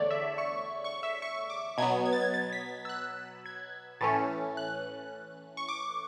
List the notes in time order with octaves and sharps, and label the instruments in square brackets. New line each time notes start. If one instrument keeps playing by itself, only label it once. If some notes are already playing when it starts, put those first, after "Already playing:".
Already playing: [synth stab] E2 D3 A3 C#5 D5
E5
C#6
C#6
E5
C#6
D6
B2 F#3 B3 G#6
G#6
A6
G#6
A6
B6
E6
F#6
G#6
A2 E3 A3 C#4 A6
F#6
C#6
D6